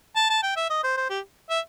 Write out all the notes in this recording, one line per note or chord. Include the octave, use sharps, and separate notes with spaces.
A5
A5
G5
E5
D#5
C5
C5
G4
E5